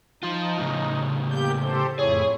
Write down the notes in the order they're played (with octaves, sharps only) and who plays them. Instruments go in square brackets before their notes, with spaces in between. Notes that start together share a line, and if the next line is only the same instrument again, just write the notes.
[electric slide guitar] F3 F4 [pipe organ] D#4
[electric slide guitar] A2 C#3
[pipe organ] A#3 G4 G6
G4 A4 C5
[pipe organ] F2 A2 E4 [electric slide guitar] G#4 [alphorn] C#5